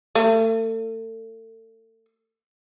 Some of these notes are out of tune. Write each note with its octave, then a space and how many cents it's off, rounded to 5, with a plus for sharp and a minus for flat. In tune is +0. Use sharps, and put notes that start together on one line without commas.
A3 +35